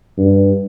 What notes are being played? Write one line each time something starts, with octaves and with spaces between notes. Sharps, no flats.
G2